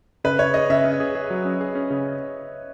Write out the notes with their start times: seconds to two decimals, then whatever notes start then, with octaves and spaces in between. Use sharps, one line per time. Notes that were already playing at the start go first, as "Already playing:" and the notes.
0.24 C#3 B4
0.39 C#3 C#5
0.54 G#4 D#5
0.70 C#3 E5
0.85 C#4
1.00 G#4
1.15 G#4
1.30 F#3
1.45 C#4
1.61 G#4
1.75 C#4
1.90 C#3